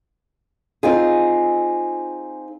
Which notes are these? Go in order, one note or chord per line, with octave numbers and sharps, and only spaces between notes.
C4 D#4 F4 G#4